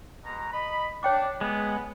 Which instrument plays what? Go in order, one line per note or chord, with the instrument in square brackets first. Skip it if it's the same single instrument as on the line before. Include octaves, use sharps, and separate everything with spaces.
[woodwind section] B2 G#3 A#5
D#5 B5
[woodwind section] D4 [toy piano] C#5 G5 D6
[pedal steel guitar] G#3 [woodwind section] B3